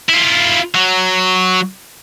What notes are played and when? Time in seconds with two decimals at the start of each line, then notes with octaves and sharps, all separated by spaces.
0.09 E4 F4
0.75 F#3